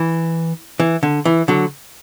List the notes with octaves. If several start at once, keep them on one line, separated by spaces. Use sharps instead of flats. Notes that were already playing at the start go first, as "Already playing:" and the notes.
Already playing: E3
E3
D3
E3
D3 F#3